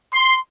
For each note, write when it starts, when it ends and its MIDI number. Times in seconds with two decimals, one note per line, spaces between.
0.14 0.36 84